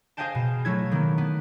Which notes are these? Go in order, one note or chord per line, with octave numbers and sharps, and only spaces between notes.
G#4 C5 D#5 F5 G5 A5
B2
F#3 A3 E4 G#6
D#3 A#3 B3
B3